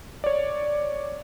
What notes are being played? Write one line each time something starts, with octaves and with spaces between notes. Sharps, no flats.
C#5 D5